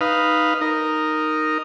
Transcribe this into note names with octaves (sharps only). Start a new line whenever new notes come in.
D#4 B4 F5
D#4 A#4